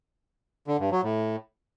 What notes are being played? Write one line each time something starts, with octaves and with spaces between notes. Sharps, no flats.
D3
G2
F#3
A2